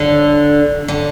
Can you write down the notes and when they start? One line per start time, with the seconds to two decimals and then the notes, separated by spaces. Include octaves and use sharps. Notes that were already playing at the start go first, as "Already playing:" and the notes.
Already playing: D3
0.88 D3